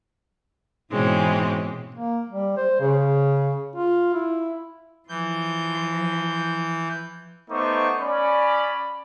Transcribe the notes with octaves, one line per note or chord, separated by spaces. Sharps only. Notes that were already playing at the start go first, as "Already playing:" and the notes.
G#2 B2 E3 G#3 C4 C#4
A#3
G3
C5
C#3
F4
E4
E3 F3 G6
A3 B3 D#4 C5 C#6 D6
C#4 D5 B5